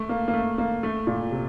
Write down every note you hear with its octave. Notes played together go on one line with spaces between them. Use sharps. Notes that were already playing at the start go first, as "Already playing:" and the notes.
Already playing: A3
A#3
A#3
A3
A#3
A3
A#2
C3